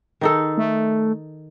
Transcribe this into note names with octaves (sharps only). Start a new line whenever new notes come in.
D#3 D#4 A4
A3